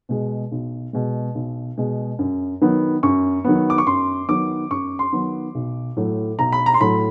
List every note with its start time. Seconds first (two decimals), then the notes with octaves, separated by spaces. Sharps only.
0.09 B2 G#3
0.52 B1
0.93 B2 G#3
1.35 B1
1.77 B2 G#3
2.19 F#2
2.61 D#3 F#3 B3
3.03 F#2 C#6
3.44 D#3 F#3 B3
3.70 D6
3.78 C#6
3.87 F#2 C6
4.29 D#3 F#3 B3 D6
4.71 F#2 C#6
4.99 C6
5.12 D#3 F#3 B3
5.55 B1
5.97 A2 F#3 A3
6.39 B1 A#5
6.52 B5
6.66 A#5
6.74 C6
6.80 A2 F#3 A3 B5